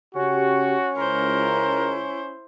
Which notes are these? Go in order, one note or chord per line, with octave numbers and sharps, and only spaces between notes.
C#3 C#4 F#4 G4
C#2 E4 A#4 C5